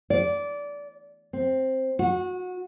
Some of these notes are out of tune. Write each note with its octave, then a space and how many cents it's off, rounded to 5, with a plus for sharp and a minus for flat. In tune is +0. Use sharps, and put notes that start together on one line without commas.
D5 -20
C4 +5
F#4 -25